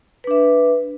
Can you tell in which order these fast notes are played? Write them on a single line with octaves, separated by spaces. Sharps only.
B4 D4 E5